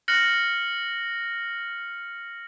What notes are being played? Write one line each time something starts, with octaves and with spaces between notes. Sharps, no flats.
F6 F#6 A#6 C#7 F#7